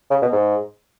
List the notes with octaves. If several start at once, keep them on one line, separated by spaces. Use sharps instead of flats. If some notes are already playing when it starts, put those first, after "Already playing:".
C#3
B2
G#2